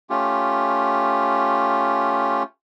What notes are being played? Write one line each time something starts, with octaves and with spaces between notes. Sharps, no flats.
A3 C#4 F4 G4